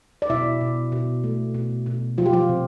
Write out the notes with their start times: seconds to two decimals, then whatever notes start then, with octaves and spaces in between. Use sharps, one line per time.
0.22 D5
0.30 B2 E4 E5
0.61 B2
0.92 B2
1.24 A3
1.54 B2
1.86 B2
2.18 F3 F4
2.26 G4
2.33 F3 F4
2.49 C3